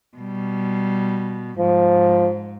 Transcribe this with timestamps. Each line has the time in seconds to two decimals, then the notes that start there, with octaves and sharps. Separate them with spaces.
0.17 B2 G3
1.59 G#2 F3